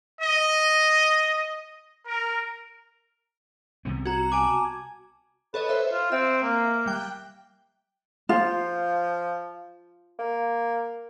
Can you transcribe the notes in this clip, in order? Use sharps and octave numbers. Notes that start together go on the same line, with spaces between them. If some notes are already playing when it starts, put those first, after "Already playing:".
D#5
A#4
C2 C3 B3
F#4 A#5 G#6
G#5 A5 D6
A4 B4 C#5 D#5
C5 E5
F4
C4 E5
A#3
G3 G5 F#6
F3 F4
A#3